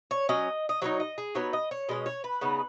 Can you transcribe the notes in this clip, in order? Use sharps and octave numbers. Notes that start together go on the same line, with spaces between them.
C#5
F#3 C#4 D#5
D#5
F#3 B3 D#4 C#5
D#5
G#4
F#3 B3 D#4 C#5
D#5
C#5
B2 G#3 C#4 D#5
C#5
B4
C#3 B3 D#4